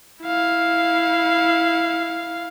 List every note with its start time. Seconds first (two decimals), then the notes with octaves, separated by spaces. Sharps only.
0.23 E4 F5